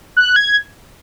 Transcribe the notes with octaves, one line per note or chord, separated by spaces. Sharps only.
F#6
G#6